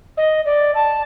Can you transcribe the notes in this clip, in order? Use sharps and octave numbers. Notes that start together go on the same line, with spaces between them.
D#5
D5
A5